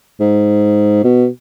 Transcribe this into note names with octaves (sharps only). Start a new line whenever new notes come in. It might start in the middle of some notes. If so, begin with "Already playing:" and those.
G#2
B2